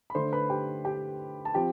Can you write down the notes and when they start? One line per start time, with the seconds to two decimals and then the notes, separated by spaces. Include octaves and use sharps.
0.10 B5
0.15 D3 A3 D4 C5 C6
0.32 B4 B5
0.50 G4 G5
0.85 G4 G5
1.45 A5
1.54 F3 C4 G4 G5